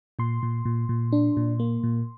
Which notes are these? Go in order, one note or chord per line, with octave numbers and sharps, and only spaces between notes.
A#2 C6
A#2
A#2
A#2
D4
A#2
A#3
A#2